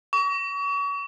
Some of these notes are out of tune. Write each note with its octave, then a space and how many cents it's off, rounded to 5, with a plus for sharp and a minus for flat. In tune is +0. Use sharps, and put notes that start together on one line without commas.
C#6 +35